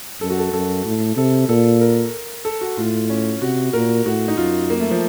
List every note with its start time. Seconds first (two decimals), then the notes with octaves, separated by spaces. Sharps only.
0.21 F#2 A4
0.30 F#4
0.39 A4
0.53 F#2 A4
0.85 A2
1.17 C3 A4
1.49 A#2 A4
1.81 A#4
2.45 A4
2.61 F#4
2.77 A2 F4
3.10 C#4
3.41 C3 F#4
3.73 A#2 A#4
4.06 A2 F#4
4.28 D#4
4.37 F#2 F4
4.70 A#3
4.80 A3
4.91 F3